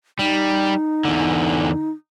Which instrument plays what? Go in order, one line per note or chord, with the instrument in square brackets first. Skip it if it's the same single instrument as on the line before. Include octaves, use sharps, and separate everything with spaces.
[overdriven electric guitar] G3 [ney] D#4
[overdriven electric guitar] E2 D3